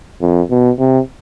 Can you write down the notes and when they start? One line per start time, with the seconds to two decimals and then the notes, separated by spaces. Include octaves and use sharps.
0.21 F2
0.50 B2
0.79 C3